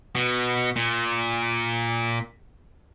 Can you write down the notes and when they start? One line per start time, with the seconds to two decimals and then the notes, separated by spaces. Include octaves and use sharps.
0.15 B2
0.76 A#2